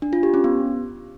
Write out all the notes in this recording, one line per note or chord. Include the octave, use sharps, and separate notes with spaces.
D4
F4
G4
C#4
B3